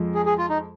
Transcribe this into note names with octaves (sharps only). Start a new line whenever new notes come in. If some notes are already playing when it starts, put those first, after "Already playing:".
Already playing: F2 F3 G#3
G#4
G#4
F4
D#4